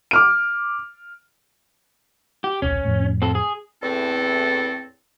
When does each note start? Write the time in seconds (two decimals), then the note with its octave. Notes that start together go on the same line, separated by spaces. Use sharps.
0.11 D6 F6 D7
2.44 G4
2.62 D#1 B1 C#4
2.85 F2 A2
3.22 C4 A4
3.35 G#4
3.82 E2 A2 C4 A4